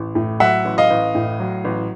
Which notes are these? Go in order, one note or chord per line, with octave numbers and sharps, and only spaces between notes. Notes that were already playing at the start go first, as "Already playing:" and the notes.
Already playing: A1
A2
F#3 E5 F#5
A1
D#5 F5
A1
A2
F#3
A1